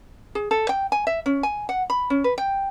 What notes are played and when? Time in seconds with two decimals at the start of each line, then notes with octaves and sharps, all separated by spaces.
0.35 G#4
0.51 A4
0.69 G5
0.92 G#5
1.07 E5
1.26 C#4
1.43 G#5
1.69 F#5
1.90 B5
2.10 C#4
2.24 B4
2.38 G5